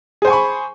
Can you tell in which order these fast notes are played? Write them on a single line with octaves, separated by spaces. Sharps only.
G#4 C5 G#5 C#6 B5